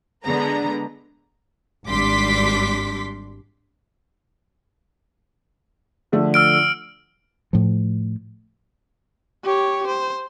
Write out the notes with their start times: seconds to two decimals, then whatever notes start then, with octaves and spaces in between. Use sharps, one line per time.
0.24 D3 G#3 B3 B4 A#5
1.86 G#1 G3 D4 C6 D6 B6
6.12 D3 F3 A3
6.34 E6 F6 D7
7.53 A2 F3
9.44 G4 C#5
9.87 C5